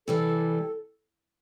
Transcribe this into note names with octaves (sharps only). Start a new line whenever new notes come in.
C3 E3 G3 A4